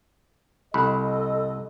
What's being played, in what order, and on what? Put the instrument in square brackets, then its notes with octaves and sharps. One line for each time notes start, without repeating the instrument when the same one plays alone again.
[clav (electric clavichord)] C2 [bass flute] A4 [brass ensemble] D#5 [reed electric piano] B5